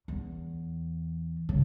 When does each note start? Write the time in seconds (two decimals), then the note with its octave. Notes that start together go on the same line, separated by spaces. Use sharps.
0.08 E2
1.49 C#3